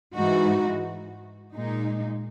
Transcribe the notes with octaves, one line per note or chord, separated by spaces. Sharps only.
G#2 E3 G#3 D#4 F#4
A#2 G#3 D#4